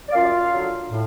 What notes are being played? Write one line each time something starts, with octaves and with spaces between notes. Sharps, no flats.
D5
F#2 F4 F5
D3 F#3
A2